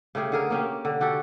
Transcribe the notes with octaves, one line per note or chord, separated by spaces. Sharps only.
C#3 A3 G4 G#4
D3 G#4 A#4
A#3 C#4 G4
D3
F#4 G4 A4